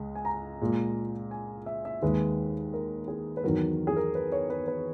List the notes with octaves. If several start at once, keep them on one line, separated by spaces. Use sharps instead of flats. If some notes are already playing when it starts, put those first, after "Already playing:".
Already playing: C#2 G#3
G#5
A#5
A#2 G#3
G#5
E5
E5
D#2 D#3 G#3 B4
A#4
G#4
B4
E2 D#3 F#3 A#4
G#4
A#4
B4
C#5
B4
B4